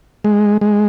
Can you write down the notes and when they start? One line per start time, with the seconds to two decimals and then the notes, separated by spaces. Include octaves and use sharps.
0.24 G#3
0.61 G#3